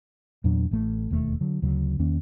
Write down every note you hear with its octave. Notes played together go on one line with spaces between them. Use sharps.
E2 A#2 F#3 D4
A1 A3
E1 D#2 D3 A3
D3 F#3
D2 C#3 F#3
E2 D#3 A#3 C#4